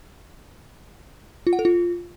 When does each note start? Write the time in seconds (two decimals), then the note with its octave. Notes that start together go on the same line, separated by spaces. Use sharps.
1.47 F4
1.53 F#5
1.59 A4
1.65 F4